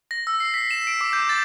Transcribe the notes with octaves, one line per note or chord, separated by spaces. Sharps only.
A#6
E6
C7
B6
E7
D7
D6
G6
A6